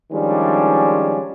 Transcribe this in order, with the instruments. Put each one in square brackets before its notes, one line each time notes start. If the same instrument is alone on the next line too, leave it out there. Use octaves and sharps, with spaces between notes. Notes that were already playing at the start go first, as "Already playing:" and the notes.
[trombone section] D#3 F3 G3 G#3 C#4 D4